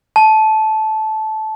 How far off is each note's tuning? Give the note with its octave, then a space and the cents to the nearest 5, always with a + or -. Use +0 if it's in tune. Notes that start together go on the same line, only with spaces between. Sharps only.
A5 -15